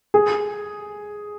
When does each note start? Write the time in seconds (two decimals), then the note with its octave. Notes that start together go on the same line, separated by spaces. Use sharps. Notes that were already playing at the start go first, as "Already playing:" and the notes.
0.14 G#4